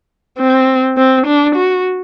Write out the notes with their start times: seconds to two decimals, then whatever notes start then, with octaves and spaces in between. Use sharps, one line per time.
0.38 C4
0.97 C4
1.26 D4
1.56 F#4